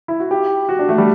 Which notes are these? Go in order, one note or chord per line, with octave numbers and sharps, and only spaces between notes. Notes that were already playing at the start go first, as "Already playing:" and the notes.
E4
F#4
G4
F#4
D4
A3
G3